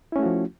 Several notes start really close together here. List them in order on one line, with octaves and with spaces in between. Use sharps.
E4 C#4 A3 F#4 F3